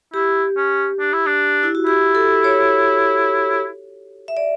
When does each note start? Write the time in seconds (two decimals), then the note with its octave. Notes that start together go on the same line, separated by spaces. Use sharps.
0.14 E4 G4
0.57 C#4
1.00 D4
1.13 E4
1.26 D4
1.63 E4
1.75 F#4
1.86 E4 G4
2.15 A4
2.44 C#5
4.28 E5
4.37 D5